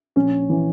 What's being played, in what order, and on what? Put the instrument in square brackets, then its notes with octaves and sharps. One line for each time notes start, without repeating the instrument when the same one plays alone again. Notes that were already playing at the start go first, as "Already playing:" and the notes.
[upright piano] A#1 C#4
E3